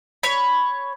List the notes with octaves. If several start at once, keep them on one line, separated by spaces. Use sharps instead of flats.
C#5 B5